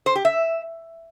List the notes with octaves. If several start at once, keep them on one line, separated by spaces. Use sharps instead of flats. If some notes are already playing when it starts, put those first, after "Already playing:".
C5
G4
E5